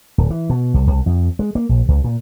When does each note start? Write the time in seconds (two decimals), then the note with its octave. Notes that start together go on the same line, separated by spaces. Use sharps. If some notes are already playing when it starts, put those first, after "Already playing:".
0.18 D1
0.30 E3
0.50 B2
0.74 C2
0.87 C2
1.06 F2
1.39 G#3
1.55 A#3
1.69 A#1
1.88 C#2
2.04 A#2